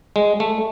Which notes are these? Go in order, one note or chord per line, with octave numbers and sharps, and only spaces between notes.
G#3
A3